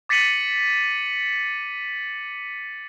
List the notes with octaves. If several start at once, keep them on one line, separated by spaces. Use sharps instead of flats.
D6 A6 B6 C#7 D#7 F#7